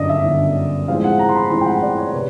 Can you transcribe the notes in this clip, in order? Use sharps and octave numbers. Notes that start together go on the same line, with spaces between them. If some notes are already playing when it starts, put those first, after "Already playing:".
Already playing: G1 F#2 D3 D5 D#5
E5
G1 F#2 D3
A1 A2 F3 G#3 C4 F5
F#5
A#5
C6
B5
A1 A2 F3 G#3 C4 C6
G5
F#5
D5
C#5
C3 B4